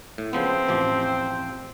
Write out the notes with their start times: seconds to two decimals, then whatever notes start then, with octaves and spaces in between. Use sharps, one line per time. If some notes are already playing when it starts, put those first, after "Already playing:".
0.18 A2
0.33 C#3 F3 B3 C4
0.68 A1 F3 G4